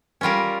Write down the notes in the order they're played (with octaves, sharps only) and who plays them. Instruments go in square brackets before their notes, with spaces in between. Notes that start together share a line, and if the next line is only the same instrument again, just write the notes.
[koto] G3 C#4 F4 A#4